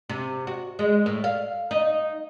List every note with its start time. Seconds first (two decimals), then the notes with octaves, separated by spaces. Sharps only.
0.09 C3
0.47 F#4
0.79 G#3
1.06 A2
1.24 F5
1.71 D#4